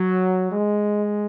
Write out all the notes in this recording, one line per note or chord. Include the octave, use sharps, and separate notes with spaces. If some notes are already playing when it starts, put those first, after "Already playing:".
Already playing: F#3
G#3